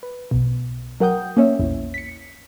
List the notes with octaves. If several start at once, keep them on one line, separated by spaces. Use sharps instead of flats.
B4
B1 B2
F#3 A#4 F#5 G5 D#6 G6
A#3 C#4 C#5 E5
A#1 E2 E4
B6 C#7